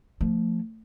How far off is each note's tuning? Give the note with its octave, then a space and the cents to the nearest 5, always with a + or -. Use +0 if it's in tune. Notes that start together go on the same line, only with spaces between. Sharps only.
F3 +0 A3 +25